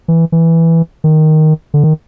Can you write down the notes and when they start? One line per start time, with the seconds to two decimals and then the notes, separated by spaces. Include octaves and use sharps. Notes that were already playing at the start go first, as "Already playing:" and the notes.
0.08 E3
0.32 E3
1.04 D#3
1.74 D3
1.84 D#3